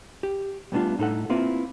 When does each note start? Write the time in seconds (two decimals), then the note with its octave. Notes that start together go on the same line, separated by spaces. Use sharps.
0.23 G4
0.72 G3 A3 B3 C4 D4 F4
0.99 A2 D#4 A4 F#5
1.30 A#3 C4 E4 F4 B4